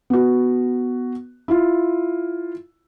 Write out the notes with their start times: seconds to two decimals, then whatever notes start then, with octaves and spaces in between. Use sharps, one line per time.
0.10 B3 F#4
1.48 E4 F4